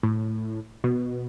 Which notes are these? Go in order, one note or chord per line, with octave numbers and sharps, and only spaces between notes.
A2
B2